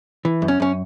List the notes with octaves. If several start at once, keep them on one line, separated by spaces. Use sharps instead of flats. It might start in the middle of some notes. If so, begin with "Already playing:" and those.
E3
F#2
C#4
F#2 C#4